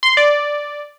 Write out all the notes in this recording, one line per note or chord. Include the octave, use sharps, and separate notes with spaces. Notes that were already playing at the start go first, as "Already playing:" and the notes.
C6
D5